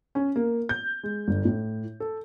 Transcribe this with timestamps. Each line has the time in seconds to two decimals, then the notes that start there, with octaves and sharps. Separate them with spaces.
0.15 C#4
0.36 A#3
0.69 G6
1.03 G#3
1.28 G1
1.45 A2
2.00 A4